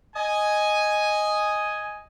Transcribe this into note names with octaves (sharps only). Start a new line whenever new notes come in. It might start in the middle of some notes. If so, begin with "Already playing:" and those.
D#5 G#5